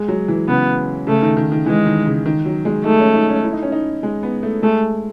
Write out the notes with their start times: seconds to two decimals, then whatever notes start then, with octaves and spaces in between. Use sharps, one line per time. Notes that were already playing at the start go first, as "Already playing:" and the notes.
Already playing: G#3
0.08 F#3
0.28 E3
0.48 C#3 B3
1.07 C#3 A3
1.22 D#3
1.37 D#3
1.52 D#3
1.66 E3 G#3
1.86 D#3
2.06 C#3
2.26 D#3
2.45 F#3
2.65 G#3
2.84 A3 D#4
3.00 C#4
3.15 D#4
3.29 C#4
3.44 E4
3.53 D#4
3.62 C#4
3.72 D#4
4.03 G#3
4.23 B3
4.43 A3
4.62 G#3 A3